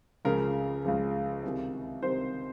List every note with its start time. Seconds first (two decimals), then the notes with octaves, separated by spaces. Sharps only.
0.25 C#2 C#3 F3 A#4
0.84 C#2 C#3 F3
1.43 C2 C3 D#3
2.03 C2 C3 D#3 C5